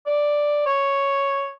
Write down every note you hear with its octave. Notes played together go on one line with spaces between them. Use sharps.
D5
C#5